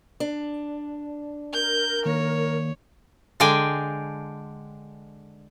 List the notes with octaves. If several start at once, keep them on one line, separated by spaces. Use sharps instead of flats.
D4
A#4 G6
D#3 A#3 C#5
D3 G#3 D5 G5 G#5